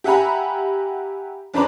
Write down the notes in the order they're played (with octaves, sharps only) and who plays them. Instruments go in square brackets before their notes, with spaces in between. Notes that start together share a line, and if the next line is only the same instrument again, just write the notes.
[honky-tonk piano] G4 E5 F#5 G#5 A#5 B5
F2 D4 B4 C5 A#5 D6